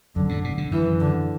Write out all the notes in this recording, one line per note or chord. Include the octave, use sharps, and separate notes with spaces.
F#2 D3
A2
B2
D3
F#2 E3
D3